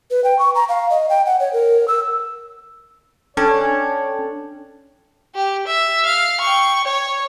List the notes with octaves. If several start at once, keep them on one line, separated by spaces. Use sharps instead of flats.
B4
G5
C#6
A#5
F5
D#5
G5
F#5
C#5
A#4
E6
C#4 D4 A4 C#5 G5 A5
G4
E5
F5
G5 C#6
C#5